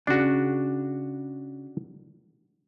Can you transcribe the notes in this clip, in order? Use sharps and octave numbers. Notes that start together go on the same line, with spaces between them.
C#3 D4 F#4